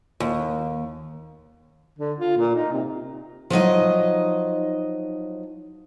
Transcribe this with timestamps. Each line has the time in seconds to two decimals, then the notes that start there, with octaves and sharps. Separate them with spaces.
0.20 D#2
1.99 D3
2.19 F4
2.38 A#2
2.55 D#4
2.73 C3
3.50 F3 F#3 D#4 D#5